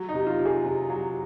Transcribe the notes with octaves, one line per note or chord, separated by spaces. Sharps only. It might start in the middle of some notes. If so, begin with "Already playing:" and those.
Already playing: F#3
D#4
C3
F4
C3
G#4
C3
F#3